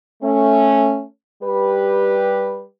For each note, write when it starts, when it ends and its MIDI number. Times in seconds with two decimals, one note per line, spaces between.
0.23 1.03 57
0.23 1.03 61
1.43 2.65 55
1.43 2.65 67
1.43 2.65 71